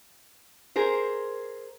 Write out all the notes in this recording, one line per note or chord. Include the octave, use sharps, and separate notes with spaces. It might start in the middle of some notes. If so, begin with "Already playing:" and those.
G#4 A#4 C5